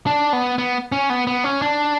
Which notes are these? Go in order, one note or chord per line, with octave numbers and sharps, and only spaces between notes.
D4
B3
B3
C#4
B3
B3
C#4
D4